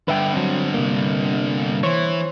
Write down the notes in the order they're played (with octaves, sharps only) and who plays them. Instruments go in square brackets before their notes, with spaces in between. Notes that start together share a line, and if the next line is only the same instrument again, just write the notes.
[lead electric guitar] G2 D3 [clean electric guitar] B4 E5 G5
[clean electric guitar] F#3 C4
C3 A#3
[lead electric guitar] E3 [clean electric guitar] C5 C#5